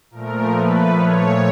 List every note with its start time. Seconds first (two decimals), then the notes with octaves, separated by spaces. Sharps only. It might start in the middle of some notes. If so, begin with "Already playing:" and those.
0.10 A#2 F3 A3 A#4
0.52 B4
0.93 C#5